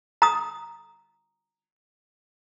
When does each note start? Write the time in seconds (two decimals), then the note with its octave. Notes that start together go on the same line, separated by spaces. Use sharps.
0.22 A#5 D#6